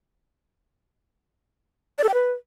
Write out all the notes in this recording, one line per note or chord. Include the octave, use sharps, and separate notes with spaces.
D5
A4
G5
B4